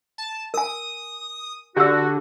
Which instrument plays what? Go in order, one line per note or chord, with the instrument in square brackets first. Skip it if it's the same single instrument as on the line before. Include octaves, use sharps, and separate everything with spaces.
[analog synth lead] A5
[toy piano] A#4 G#5 [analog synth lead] D#6
[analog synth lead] D3 [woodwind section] F#4 [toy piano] G4 C#6 E6